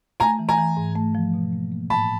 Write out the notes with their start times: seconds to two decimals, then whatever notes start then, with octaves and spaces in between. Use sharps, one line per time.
0.20 A3 G#5 A#5
0.39 E3
0.49 G#5 A#5
0.58 E3
0.77 G#2
0.95 A3
1.15 F3
1.34 B2
1.53 A#3
1.72 A#3
1.90 A2 A5 B5